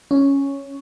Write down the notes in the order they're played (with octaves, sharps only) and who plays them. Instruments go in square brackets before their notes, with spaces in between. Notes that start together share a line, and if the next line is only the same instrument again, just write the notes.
[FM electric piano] C#4